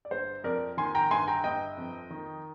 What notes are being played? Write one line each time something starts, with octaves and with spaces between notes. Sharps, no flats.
D5
G1 C5
F2 A#4 D5
D#3 G#5 C6
G5 A#5
G1 G#5 C6
G5 A#5
G1 D#5 G5
F2
D#3